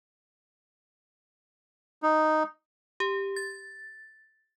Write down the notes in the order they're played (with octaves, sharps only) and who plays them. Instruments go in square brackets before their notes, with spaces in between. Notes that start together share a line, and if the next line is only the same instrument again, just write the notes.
[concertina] D#4
[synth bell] G4
A6